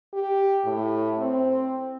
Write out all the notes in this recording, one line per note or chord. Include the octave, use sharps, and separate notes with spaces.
G4
A2
C4